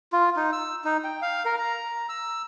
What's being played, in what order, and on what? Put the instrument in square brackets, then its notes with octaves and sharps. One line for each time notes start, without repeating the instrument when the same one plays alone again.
[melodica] F4
D#4
E6
D#4
G5
F5
A#4
A#5
E6